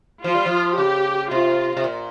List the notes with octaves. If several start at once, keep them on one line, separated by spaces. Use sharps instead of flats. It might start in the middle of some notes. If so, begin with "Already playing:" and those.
F3 F4
G3
F3
C#3 G4
C3 F4
C3
A#2